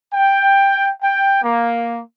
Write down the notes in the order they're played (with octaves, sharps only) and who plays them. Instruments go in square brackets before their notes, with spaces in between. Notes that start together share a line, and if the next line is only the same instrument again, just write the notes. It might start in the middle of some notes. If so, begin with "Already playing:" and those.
[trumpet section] G5
G5
A#3